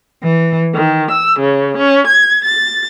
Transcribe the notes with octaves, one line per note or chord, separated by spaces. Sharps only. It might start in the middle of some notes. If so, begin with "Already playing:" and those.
E3
D#3
E6
C#3
C#4
G#6
A6